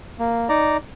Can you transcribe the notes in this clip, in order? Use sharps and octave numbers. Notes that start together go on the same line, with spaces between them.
A#3
D#4 D5 A#5